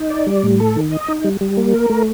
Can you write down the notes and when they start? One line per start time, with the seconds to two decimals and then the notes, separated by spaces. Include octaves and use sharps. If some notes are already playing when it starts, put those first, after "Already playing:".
Already playing: D#4
0.10 D5
0.27 G3
0.43 A2
0.60 A4
0.76 D#3
0.92 D#5
1.08 D#4
1.24 G3
1.41 G3
1.57 A#3
1.74 A#4
1.90 A3